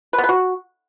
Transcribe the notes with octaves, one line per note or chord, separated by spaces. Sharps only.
B4
B3
B4
F#4